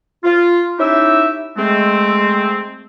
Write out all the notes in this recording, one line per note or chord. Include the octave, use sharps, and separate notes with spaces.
F4
C#4 D#4 E4 G4 E5
G#3 A3 C4